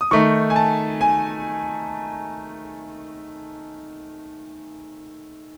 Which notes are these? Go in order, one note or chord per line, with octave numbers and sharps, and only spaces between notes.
D#6
D#3 A3 D#4 C#6
G#5
A5
G#5